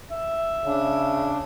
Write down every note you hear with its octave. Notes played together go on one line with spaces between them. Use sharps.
E5
C#3 D4